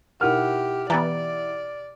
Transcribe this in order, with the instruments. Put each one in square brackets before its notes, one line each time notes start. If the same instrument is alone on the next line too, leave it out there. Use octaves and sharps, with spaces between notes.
[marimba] B2 D#4 A#4 [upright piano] E4 F#5 F6 [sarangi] G4
[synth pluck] E3 B3 [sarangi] D5 [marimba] A#5 A6